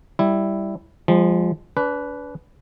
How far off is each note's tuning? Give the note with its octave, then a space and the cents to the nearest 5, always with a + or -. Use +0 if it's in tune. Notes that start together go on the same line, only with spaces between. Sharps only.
G3 +0 E4 +0
F3 +0 G#3 -35
D4 -35 B4 +0